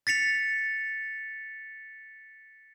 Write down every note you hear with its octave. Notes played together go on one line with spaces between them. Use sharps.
A6 B6 C#7 F7